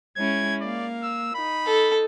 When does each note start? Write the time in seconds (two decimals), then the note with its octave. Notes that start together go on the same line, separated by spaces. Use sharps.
0.16 G#3 C#4 E4 G#6
0.61 A#3 A#4 D5 F5
1.02 E6
1.35 D#4 B5
1.66 A4